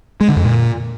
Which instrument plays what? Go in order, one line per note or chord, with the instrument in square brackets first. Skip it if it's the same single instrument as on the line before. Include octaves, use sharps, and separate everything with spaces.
[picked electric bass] G#3
D3
F2
A#2